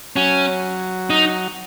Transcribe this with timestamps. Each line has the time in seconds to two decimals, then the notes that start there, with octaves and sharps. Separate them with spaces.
0.16 F#3 C#4
1.10 D#4